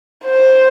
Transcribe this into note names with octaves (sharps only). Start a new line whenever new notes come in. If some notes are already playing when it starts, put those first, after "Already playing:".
C5